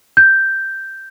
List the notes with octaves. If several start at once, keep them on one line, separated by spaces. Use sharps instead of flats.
G6